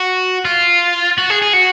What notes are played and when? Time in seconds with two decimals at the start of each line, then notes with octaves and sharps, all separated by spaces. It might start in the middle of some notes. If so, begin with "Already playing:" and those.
Already playing: F#4
0.45 F4
1.18 F#4
1.30 G#4
1.42 G#4
1.53 F#4